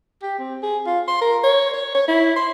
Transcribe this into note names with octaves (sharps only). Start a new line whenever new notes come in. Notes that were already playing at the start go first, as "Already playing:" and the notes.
G4
C4
G#4
F4
C6
A#4
C#5
C#5
C#5
E4
C6